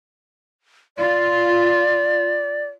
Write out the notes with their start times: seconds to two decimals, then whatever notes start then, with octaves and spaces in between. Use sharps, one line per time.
0.98 F4 D5